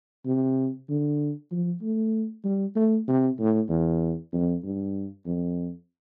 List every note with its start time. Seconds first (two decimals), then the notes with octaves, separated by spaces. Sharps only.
0.26 C3
0.89 D3
1.52 F3
1.82 A3
2.45 G3
2.76 A3
3.08 C3
3.39 A2
3.69 E2
4.33 F2
4.64 G2
5.26 F2